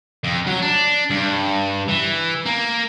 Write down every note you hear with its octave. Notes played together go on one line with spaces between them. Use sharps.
F2
F#3
D4
G2
E3
A#3